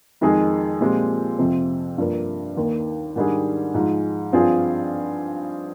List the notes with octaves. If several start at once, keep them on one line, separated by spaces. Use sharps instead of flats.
F2 D#3 G#3 D#4 G#4
A#2 F3 G#3 C4 G4
F2 C3 F3 C4
G2 F3 A#3
D#2 D#3 A#3
G#2 D#3 G3 D4 G#4
G#2 F3 G#3
G2 F3 C4 F4 G#4